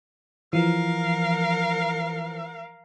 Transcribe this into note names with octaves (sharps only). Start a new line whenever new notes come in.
E3 F3 A#4 F5